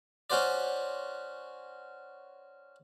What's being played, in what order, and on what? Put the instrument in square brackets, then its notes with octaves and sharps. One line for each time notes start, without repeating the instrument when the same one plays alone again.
[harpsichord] C#4 F#4 C5 D5